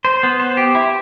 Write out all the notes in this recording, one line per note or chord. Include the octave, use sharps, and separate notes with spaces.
C5
B3
C5
G4
E4